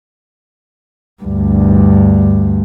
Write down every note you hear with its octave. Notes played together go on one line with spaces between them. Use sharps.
D2 G2